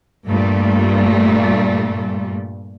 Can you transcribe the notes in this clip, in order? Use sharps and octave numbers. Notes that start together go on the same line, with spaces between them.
G2 A#2 G3 A3